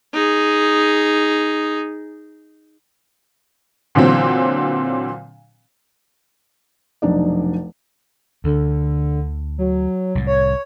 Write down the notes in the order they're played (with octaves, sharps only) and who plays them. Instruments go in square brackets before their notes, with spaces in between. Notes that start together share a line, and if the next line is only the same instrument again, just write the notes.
[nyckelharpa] D#4 G#4
[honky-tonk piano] A#2 D3 E3 F#3 C4
[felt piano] F1 B1 D4 D#4 D5
[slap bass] D2 [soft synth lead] D3
[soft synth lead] F#3
[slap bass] C2 A2
[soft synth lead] C#5